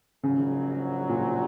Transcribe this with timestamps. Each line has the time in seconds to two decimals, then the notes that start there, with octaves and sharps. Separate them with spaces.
0.24 A#1 G#2 C#3 F#3
1.09 A#2